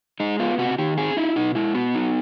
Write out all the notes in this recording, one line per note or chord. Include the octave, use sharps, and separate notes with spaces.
G#3 D#4
B3 F4
C3 F#4
D#3 G4
C4 G#4
D#4 E4
B2 D#4
G#3 E4
B3 F#4
D#4